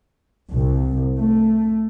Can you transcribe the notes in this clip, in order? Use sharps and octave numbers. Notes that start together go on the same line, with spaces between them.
C2
A3